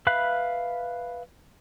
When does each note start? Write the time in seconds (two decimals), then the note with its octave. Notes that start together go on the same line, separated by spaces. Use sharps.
0.07 B4 E5 F5 B5 F#6